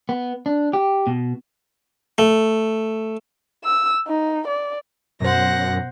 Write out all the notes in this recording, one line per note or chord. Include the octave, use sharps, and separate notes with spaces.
B3
D4
G4
B2
A3
E6
D#4
D5
F#2 B2 C5 F#5 A#6